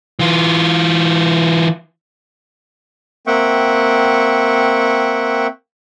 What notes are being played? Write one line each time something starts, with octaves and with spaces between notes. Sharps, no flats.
E3 F4
A#3 C4 E5 F#5 G5 C#6